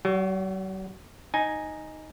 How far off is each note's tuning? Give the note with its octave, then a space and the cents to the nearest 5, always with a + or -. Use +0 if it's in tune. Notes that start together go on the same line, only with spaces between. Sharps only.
F#3 +45 F#4 +0
D#4 +0 G#5 +0